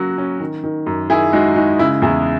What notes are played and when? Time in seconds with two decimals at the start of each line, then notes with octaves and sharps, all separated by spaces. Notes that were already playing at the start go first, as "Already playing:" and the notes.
Already playing: C#3 F#3 A#3 C#4 F#4
0.18 C#4
0.40 D#3
0.64 D#3
0.86 F#2
1.10 D#3 E4 G#4
1.33 G#3 D#4 F#4
1.56 G#3 D#4 F#4
1.79 C#3 E4
2.02 E2 E4 G#4